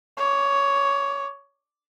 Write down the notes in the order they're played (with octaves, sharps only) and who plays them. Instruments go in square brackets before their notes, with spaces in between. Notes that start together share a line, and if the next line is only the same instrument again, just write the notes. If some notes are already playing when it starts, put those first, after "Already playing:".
[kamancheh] C#5 D6